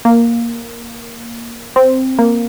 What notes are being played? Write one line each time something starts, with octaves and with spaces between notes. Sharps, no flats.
A#3
C4
A#3